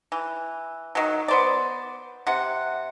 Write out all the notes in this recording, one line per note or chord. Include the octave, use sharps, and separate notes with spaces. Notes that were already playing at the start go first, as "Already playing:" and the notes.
E3
D#3 F#3
B3 C5 D5
C3 F#5